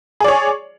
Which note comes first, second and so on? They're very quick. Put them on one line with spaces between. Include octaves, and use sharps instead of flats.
G#4 D5 C#5